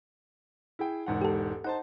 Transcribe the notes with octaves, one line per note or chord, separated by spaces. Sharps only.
E4 G#4 G5
E1 G#2 F#5
G4 A4
D#4 C5 F#5 A5